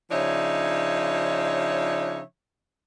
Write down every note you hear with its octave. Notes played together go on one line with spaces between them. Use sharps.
C#3 F3 D4 D#4 C#5 E5